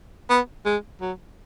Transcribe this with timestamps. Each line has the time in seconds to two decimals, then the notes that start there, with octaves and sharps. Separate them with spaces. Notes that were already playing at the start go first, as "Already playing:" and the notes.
0.30 B3
0.66 G#3
1.01 F#3